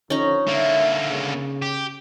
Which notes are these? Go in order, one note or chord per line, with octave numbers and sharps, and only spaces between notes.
D3 F3 C#4 D#4 A#5
D3 A#3 E5
C#3
G4